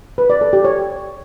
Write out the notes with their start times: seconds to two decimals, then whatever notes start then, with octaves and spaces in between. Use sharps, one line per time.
0.18 B4
0.30 D5
0.41 A4
0.53 G4
0.65 C#5